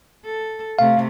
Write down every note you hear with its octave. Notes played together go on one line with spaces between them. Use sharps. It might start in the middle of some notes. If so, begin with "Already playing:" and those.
A4
C3 A3 F5